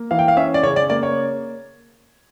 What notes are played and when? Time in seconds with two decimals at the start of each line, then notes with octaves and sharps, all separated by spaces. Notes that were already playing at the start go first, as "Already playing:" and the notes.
Already playing: A#3
0.11 E3 F5
0.19 G5
0.28 F5
0.37 C#4 E5
0.54 D5
0.63 C#3 C#5
0.76 D5
0.90 A#3 D5
1.03 C#5